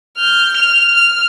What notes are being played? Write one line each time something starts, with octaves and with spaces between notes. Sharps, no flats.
F6 G6
F6 F7
F6